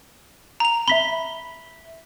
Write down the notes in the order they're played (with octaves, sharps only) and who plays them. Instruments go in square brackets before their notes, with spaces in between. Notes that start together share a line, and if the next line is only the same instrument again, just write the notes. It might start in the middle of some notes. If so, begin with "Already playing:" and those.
[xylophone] A#5 F7
[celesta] E5 B6 G7 [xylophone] B5